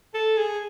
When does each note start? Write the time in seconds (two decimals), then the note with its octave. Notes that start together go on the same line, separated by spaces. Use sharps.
0.14 A4
0.37 G#4